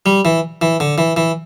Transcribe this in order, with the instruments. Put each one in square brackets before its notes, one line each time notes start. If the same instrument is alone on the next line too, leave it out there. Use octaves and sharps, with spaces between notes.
[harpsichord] G3
E3
E3
D3
E3
E3